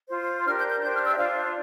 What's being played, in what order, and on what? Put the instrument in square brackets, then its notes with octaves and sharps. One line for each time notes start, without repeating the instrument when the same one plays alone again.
[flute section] F4 C5
D4 G4 A#4 F6
G6
G6
D4 G4 C5 G6
F6
E6
E5
D4 F4 C5 F5